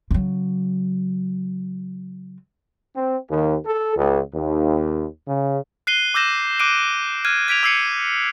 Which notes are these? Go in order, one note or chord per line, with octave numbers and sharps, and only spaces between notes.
C#3 F#3
C4
D#2
A4
C#2
D#2
C#3
F#6 C7 D#7 G7
D6 E6 G6 A#6 E7
D6 F#6 D7 D#7
F6 F#6 G#6 D#7
G#6 B6 D7 F7
D6 E6 G#6 C7 C#7 D#7